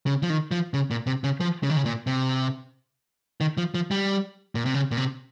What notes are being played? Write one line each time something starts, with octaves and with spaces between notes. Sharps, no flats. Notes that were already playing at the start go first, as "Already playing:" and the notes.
C#3
F3
D#3
F3
C#3
A#2
C3
C#3
F3
C#3
D#3
C#3
A#2
C3
D#3
F3
F3
G3
A#2
C3
C#3
A#2
C3